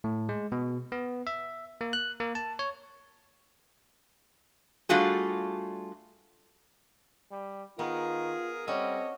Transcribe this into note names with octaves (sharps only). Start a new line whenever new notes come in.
A2
G#3
B2
B3
E5
A#3
F#6
A#3
A5
C#5
G3 A3 D4 F4 F#4 G#4
G3
D#3 B3 F4 G#4 A#4
G3 C4 C#4 F#4 A4 C#5 D#5